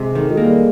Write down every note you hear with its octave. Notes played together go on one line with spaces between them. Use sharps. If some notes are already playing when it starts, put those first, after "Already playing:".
Already playing: C3 G#3
D#3 A3
G#3
A#3
G3